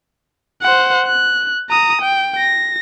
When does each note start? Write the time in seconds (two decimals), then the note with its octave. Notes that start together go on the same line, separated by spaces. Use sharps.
0.62 C5 F#5
1.07 F#6
1.70 A#5 D#6
2.02 G5
2.39 A#6